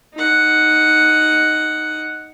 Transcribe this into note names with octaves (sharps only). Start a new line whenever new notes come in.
D#4 F#5